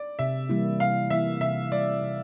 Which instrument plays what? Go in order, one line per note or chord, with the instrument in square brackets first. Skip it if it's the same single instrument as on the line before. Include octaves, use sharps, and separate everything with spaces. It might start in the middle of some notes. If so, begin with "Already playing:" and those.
Already playing: [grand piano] D5
[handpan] C3 [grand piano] E5
[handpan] E3 G3 A#3 E4
[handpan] C3 [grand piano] F5
[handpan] E3 G3 A#3 E4 [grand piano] E5
[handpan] C3 [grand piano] E5
[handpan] E3 G3 A#3 E4 [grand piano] D5
[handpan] C3